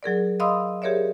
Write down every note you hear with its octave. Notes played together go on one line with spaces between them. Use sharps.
F#3 G#4 A#4 D5
D#5 F5 B5 C6 D#6 E6
G4 G#4 A#4 C#5 D5 E5